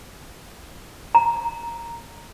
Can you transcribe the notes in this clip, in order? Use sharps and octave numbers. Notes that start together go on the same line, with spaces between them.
A#5